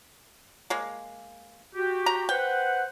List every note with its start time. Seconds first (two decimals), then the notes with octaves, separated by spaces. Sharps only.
0.70 G#3 A#3
1.75 F#4 G4
2.06 A#5
2.29 B4 C5 F#5 G5